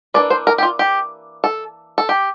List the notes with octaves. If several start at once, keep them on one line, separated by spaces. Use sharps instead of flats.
E3 A#3 D4 D5
C5
A#4
G4
F4
G4
A4
A4
G4